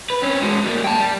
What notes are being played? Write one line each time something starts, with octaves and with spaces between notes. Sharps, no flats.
B4
C4 C#4
G#3 F#4
G3 A#3
G5 A5
G3